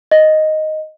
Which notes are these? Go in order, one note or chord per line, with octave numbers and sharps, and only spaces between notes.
D#5